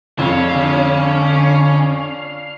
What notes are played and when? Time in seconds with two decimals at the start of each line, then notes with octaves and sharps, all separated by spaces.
0.19 F2 C#4 D4 F5
0.54 D3